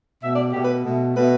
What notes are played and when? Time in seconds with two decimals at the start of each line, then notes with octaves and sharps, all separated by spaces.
0.22 B2 A3 E5
0.33 D5
0.43 D5
0.53 B2 A3 G4
0.64 B4
0.84 B2 A3
1.16 B2 A3 B4